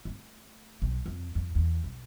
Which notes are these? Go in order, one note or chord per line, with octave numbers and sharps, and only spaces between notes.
A3
B1
F2
F2
E2
B1